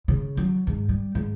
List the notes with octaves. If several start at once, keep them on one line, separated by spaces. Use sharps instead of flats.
C#3
F#3
G#2
G3
G#2